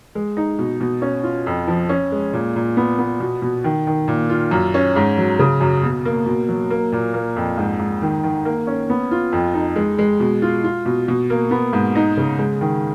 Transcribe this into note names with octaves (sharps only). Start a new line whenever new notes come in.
G#3
D#4
B2
B2
C#4
F4
F2
F3
C#4
G#3
A#2
A#2
B3
B3
B2
B2
D#3
D#3
A#2
F4
F#2
C#4
G#2
F#3
C#3
F#2
B2
A#3
B2
F#3
A#3
A#2
A#3
F2
G#2
G#2
D#3
D#3
A#3
C#4
B3
F4
F2
D#4
G#3
G#3
B2
F4
F4
B2
B2
A#3
B3
G#2
D#4
C#3
G#3
D#3